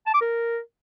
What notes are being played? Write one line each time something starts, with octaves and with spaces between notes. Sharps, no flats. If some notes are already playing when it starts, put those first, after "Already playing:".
A5
D6
A#4